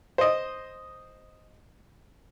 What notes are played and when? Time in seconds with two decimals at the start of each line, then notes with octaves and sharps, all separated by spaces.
0.18 C5 D#5